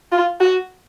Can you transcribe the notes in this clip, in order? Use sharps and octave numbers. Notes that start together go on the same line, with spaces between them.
F4
F#4